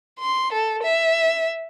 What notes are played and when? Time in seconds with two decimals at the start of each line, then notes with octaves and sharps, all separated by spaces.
0.19 C6
0.52 A4
0.83 E5